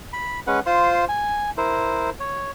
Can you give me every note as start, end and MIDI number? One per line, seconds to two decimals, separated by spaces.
0.13 0.40 83
0.47 0.60 56
0.47 0.60 61
0.47 0.60 71
0.47 0.60 78
0.66 1.05 65
0.66 1.05 72
0.66 1.05 84
1.09 1.50 80
1.57 2.10 64
1.57 2.10 70
1.57 2.10 72
2.20 2.51 73